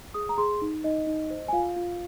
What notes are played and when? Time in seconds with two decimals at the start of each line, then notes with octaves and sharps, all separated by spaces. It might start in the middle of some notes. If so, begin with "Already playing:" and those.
0.14 G#4 D#6
0.29 A#5
0.38 G#4 C6
0.62 D#4
0.84 D#4 D#5
1.07 D#4
1.30 C5
1.48 G#5
1.53 F4 F5
1.76 F4